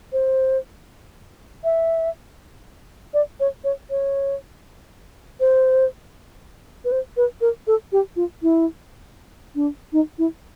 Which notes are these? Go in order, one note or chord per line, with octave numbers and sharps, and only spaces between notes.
C5
E5
D5
C#5
C#5
C#5
C5
B4
C5
B4
A#4
A4
G4
F4
E4
D4
D#4
E4